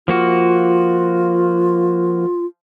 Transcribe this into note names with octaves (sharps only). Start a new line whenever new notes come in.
F3 A#3 F4 F#4